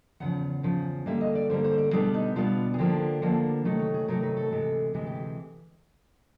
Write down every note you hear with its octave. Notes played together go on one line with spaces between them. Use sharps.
E2 C#3 F3 F#5
E2 C#3 F3
D3 G3 A#3 E5
D#5
D5
D3 G3 A#3 C5
C5
D5
B2 G3 B3 D4 G#4
D#4
B2 G3 B3 D4 F4
G#4
D3 F3 A#3 D4 G4
D3 F3 A#3 D4
C3 D#3 F#3 A3
C#5
G#4
C3 D#3 F#3 A3 A#4
B4
A4
D2 C3 E3 G#3
D2 C3 E3 G#3 G#4
G4